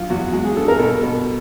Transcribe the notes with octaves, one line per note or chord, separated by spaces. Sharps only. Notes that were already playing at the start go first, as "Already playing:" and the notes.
Already playing: G2 F#3 F4
E2 F#4
G#3 F#4
G#4
G2 A4
A#4
B2 A4
B2